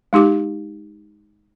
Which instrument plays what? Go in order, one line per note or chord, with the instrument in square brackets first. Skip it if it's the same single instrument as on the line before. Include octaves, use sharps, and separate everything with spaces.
[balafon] G#3 D#4 G4 D6